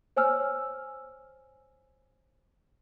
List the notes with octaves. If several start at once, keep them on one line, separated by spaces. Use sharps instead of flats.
C5 C#5 G#5 E6 F6